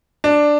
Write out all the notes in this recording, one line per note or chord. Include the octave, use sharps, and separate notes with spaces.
D4